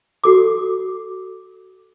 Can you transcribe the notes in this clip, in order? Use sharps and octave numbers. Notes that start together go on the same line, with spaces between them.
F#4 A4 D6